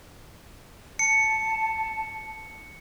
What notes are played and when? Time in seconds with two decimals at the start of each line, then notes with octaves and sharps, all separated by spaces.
0.99 A5 C#7